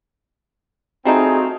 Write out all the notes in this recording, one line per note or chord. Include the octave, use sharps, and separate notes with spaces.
G3 A3 C4 D#4 F4 F#4 G#4